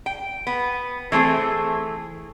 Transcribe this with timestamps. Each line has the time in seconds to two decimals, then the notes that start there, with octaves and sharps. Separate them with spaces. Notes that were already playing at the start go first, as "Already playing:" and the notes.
0.06 G5
0.47 B3
1.12 E3 A3 C4 G#4